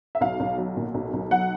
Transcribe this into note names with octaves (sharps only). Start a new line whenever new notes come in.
E5
B1 F5
B1
F#3
A#2
B1
B1
F#3 F#5